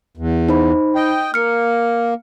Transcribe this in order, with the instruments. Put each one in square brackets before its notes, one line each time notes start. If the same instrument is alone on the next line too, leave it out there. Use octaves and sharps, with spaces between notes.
[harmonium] E2
[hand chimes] D#4 C5 B5
[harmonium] D#5 G5
[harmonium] A#3 [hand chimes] F6 C#7